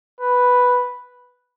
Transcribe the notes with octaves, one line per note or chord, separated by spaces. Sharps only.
B4